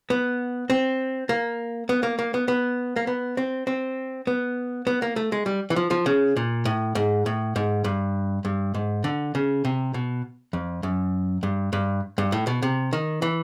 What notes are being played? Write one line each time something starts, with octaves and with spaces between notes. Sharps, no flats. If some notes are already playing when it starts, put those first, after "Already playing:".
B3
C4
A#3
B3
A#3
A#3
B3
B3
A#3
B3
C4
C4
B3
B3
A#3
A3
G#3
G3
E3
F3
F3
C#3
A#2
A2
G#2
A2
G#2
G2
G2
G#2
D3
C#3
C3
B2
F2
F#2
G2
G2
G2
A2
B2
C3
D#3
E3